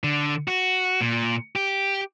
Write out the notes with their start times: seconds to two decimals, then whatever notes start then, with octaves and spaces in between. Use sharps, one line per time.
0.04 D3
0.48 F#4
1.01 A#2
1.56 G4